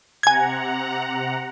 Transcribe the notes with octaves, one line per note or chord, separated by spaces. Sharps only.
C3 F#5 G#5 A#5 G#6